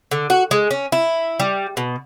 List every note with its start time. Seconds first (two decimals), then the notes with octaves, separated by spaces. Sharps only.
0.11 D3
0.30 F#4
0.51 G#3
0.71 C#4
0.92 E4
1.40 G3
1.77 B2